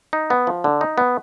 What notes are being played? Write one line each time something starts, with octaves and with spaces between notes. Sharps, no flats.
D#4
B3
F3
D3
D#4
B3